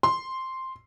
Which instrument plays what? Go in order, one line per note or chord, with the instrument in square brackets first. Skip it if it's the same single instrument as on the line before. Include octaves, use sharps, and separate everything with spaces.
[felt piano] C6